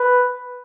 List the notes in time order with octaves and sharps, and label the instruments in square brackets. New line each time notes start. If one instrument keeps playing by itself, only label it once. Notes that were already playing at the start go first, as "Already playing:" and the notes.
Already playing: [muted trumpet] B4